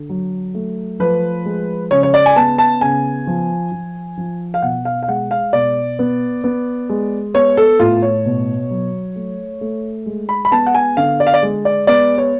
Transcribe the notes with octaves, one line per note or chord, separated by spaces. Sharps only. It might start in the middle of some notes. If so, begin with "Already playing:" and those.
Already playing: D3
F#3
A3
F3 B4
G#3
C#3 C#5
C#5
D5
G#5
B3 A5
A5
C#3 G#5
F3
F3
F3
F5
B2 F#5
F5
F5
G#3 F#5
F5
B2 D5
B3
B3
G#3
B3 C#5
A4
A2 F4
C#5
B2
F#3
A3
A3
G#3
B5
B5
B3 A5
F#5
G#5
D3 F5
D5
F5
D5
G#3
D5
B3 D5
C#5